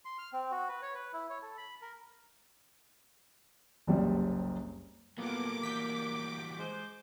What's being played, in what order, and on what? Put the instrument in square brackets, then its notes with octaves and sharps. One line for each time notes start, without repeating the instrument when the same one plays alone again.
[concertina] C6
F6
C4
F#4
B4
C#5
B4
E4
C#5
A4
B5
A#4
[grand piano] F#1 C2 F#2 G3 C4
[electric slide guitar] F#3 G3 A4 [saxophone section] A#3 [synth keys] B3 F4 [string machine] D6
[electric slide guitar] E3 G3 F#4 [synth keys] G6 B6
[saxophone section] G#3 C5